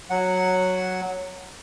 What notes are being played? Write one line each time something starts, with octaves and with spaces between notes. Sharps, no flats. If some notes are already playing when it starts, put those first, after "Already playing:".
F#3 F#5